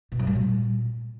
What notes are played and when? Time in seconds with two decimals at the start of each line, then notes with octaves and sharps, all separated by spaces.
0.12 B2
0.19 F#2
0.27 G3
0.35 A#2